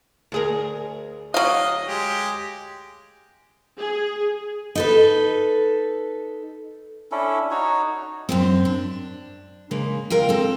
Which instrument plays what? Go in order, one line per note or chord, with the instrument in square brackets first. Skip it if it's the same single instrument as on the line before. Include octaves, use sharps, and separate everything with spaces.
[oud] D2 G#4 A#4
[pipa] F#3 F5 [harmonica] D#5
[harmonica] G#3 G4
[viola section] G#4
[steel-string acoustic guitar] D#4 A4 B4
[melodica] C#4 D4 E4 A4
D#4 F#4 C#5
[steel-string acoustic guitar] F#2 C3 C4
D4
C#3 G#3 A#3
G#3 A#4 F5 G5
C4 A4